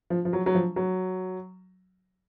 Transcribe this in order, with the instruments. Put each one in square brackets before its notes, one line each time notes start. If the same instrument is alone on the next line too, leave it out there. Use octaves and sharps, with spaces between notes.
[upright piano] F3
F3
F#3
F#3
F3
F#3